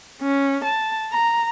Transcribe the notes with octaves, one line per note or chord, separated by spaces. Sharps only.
C#4
A5
A#5